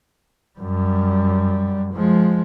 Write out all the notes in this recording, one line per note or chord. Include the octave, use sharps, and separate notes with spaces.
F#2 G3
F3 G#3